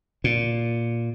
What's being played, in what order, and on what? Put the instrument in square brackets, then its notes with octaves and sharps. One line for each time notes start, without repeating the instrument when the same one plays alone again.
[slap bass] A#2